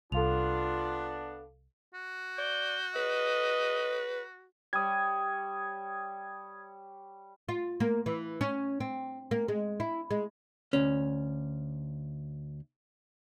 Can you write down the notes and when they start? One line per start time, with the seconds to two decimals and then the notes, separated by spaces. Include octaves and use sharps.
0.12 C2 B3 D4 F4 A4 F5 F7
1.94 F#4
2.38 D5 G6
2.96 B4 D#5
4.73 G3 C#5 D#6 G#6
7.49 F4
7.80 A#3
8.06 E3
8.41 C#4
8.80 C4
9.31 A#3
9.48 G#3
9.80 E4
10.11 G#3
10.73 D2 C#4